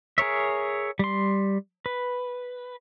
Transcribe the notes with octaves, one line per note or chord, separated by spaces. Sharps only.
G#4 A#4 C#5 E5
G3 C6
B4